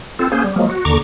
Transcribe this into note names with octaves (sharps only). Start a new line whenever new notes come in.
C4 F4 A4
A#3 C#4 G#4 C5
G3
F3 F#3 G#3 A#3
F#4
D#2 D3 A#5 C#6 D6